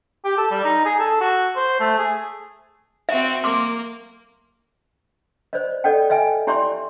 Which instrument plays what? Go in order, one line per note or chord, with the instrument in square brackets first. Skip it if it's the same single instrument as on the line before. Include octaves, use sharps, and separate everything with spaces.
[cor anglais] G4
A4
G3
D#4
G#4
A4
F#4
C5
A3
G#4
[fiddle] C4 F#4 [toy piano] E5
[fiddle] A#3 [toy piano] C6 D6
[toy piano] C5 D5 D#5
A4 D5 D#5 F#5 G5
D#5 E5 G5 G#5
E4 G4 D5 E5 C6 C#6